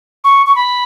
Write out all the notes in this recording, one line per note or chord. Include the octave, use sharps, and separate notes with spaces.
C#6
C#6
B5